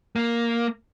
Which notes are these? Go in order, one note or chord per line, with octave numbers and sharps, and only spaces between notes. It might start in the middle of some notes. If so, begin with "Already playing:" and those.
A#3